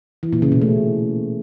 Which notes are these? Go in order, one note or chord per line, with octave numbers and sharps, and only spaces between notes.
E3
A#2
C#3
B2
A3